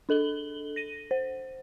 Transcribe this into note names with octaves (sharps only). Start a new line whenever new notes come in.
D4 A4 F#7 G7
A#6 D#7
C5